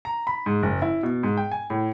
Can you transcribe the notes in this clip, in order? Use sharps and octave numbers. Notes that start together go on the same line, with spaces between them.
A#5
B5
G#2
F#1
E4
B2
G#2
G5
G#5
A2